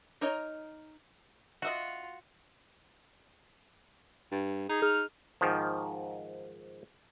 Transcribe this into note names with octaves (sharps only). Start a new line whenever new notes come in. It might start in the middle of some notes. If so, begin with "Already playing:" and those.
D#4 A#4 C#5 D#5
F4 F#4 D#5 E5 F#5
G2
D#4 G#4
G#4 F6
G#2 D#3 F3